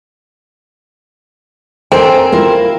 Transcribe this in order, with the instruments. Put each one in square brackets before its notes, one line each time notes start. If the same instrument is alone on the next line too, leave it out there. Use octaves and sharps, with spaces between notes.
[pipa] C4 [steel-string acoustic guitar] A4 A#4 G#5
[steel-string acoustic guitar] E4 F4 A#4